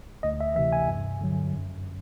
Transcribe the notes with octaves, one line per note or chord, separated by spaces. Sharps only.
D2 D#5
E5
C3 E3 E5
G#5
G2
D3 F#3
F#2